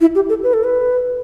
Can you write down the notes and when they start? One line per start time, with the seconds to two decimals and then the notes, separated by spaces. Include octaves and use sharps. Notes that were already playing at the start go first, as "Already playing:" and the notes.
0.01 E4
0.15 G4
0.29 A4
0.43 B4
0.54 A4
0.64 B4